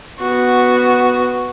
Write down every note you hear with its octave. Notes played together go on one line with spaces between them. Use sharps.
B3 F#4